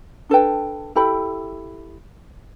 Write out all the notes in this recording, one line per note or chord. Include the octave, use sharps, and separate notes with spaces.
D4 A4 B4 G5
E4 G4 A4 B5